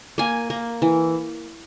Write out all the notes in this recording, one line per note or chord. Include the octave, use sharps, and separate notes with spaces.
A#3 G#5
A#3
E3